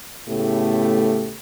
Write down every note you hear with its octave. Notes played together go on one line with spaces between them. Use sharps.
A2 C#3 A3 B3 G4